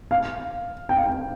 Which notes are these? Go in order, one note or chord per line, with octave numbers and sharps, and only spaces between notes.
F5
G5
F5
G5